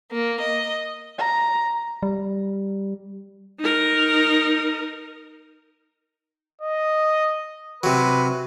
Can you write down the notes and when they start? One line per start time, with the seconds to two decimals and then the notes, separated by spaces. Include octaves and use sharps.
0.11 A#3
0.40 D#5
1.18 A#5
2.03 G3
3.59 D#4 A#4
6.61 D#5
7.83 C3 F#3 B4